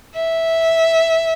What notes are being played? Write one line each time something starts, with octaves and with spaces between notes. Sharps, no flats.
E5